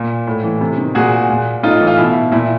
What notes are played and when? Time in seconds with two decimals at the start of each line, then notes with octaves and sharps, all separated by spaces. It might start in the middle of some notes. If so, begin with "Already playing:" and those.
Already playing: A#2
0.27 A2
0.43 E3
0.61 C3
0.78 D#3
0.95 A#2 F#4 G#4
1.30 A#2
1.63 A2 D#4 F4
1.80 E3
1.87 F4
1.98 B2 E4
2.32 A#2 E4